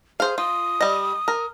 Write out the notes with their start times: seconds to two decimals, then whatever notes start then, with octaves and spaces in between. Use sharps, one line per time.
0.20 G#4 C5 F5
0.38 F4 D#6
0.81 G3 D#5
1.28 A#4